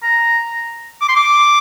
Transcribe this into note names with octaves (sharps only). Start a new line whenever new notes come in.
A#5
D6
C6
D6